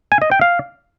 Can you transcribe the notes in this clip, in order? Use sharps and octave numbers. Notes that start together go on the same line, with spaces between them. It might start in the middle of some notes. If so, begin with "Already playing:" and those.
G#5
D#5
G5
F5